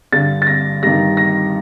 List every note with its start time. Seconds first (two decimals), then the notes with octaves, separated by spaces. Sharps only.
0.12 G2 D3 G3 A6
0.42 A6
0.47 A#6
0.82 G2 D#3 G3 A#6
1.17 A#6